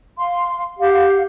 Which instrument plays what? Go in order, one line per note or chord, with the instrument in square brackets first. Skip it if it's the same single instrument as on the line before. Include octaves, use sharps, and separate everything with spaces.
[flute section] F5 C6
[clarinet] G4 [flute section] F5 F#5